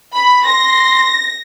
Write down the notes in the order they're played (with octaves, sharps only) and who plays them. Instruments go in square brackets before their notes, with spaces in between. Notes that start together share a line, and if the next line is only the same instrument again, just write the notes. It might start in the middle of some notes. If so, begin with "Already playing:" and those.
[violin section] B5
[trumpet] C6 [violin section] A#6